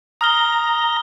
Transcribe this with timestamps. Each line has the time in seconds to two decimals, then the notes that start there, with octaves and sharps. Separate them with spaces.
0.21 A#5 D#6 F6 G7